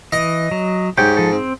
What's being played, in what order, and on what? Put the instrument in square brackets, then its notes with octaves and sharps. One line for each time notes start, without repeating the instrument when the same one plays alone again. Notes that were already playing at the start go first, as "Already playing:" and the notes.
[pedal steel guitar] E3 [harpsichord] D#5
[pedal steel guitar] F#3
[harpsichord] G#2 [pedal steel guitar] G4 C#5 G5
[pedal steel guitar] F3 A4
C4